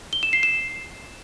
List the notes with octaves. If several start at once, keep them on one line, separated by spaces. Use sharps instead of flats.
G7
E7
C7
E7